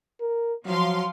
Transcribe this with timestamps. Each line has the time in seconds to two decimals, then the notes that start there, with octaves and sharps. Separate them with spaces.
0.20 A#4
0.66 F3 F#3 F5 C6